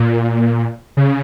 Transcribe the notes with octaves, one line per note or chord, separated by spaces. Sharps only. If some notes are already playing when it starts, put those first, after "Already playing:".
Already playing: A#2
C#3